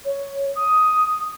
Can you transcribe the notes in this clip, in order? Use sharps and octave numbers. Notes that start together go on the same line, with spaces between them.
C#5
D#6